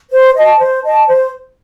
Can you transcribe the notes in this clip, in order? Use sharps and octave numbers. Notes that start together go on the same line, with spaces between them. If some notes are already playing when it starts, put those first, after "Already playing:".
C5
D#5 A5
C5
D#5 A5
C5